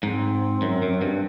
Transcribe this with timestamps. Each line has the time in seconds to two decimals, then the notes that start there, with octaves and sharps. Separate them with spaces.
0.03 G#2 C4
0.62 F#2
0.82 F#2
1.02 G2